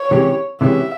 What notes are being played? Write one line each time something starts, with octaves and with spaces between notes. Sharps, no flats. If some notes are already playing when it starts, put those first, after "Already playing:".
Already playing: C#5
C3 E3 G#3 C#4 G4
C3 E3 G#3 C#4 G4 E5